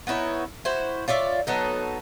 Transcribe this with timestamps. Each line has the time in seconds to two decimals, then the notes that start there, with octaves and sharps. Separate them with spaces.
0.07 B3 D#4 E4 C#5
0.65 E4 F#4 C5
1.08 F4 C#5 D5 E5
1.47 F#3 B3 D#4 A4